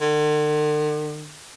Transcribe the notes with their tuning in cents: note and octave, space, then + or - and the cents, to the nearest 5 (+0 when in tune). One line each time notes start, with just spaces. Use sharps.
D3 +45